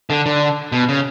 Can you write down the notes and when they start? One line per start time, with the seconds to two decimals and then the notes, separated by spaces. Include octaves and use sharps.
0.10 D3
0.26 D3
0.72 B2
0.89 C#3